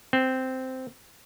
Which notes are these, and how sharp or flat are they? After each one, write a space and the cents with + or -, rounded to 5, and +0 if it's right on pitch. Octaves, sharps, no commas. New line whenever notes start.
C4 -10